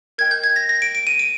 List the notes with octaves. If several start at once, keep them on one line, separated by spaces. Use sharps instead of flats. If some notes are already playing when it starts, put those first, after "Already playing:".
A#4 D#5 G5 G#6
G6
G#6
A#6
A#6
D7
D7
D#7
D7